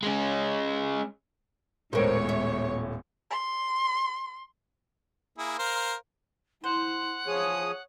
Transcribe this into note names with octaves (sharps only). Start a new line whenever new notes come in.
G#3 C#4
D#1 A2 G#3 B3 A#4 C5 C#5
E5
C6
A#3 E4 G#4
A#4 C5 F5
E4 C5 F#5
F3 G#4 C#5 D#6